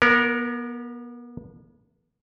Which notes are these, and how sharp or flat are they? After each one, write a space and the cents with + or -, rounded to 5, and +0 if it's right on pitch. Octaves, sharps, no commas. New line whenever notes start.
B3 -35 A#4 +0